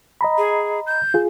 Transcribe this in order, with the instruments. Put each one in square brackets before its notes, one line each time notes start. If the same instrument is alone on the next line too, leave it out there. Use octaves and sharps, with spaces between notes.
[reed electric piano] D#5 A#5 B5
[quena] G#4
G6
[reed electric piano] F4 G#4